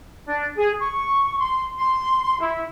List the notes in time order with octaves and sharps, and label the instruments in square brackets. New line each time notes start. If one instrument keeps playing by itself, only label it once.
[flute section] D4
G#4
C#6
C6
C6
E4